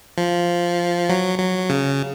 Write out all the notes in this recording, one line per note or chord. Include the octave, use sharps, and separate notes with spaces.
F3
F#3
F#3
C#3